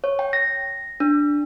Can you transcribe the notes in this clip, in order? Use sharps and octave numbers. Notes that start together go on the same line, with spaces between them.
C#5
G5
A#6
D4